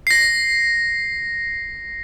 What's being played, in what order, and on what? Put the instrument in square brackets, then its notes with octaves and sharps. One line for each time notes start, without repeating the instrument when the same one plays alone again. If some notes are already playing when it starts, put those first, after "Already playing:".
[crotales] A#6 C7